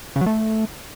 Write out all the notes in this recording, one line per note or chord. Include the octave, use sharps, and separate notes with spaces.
C#3
F#3
A3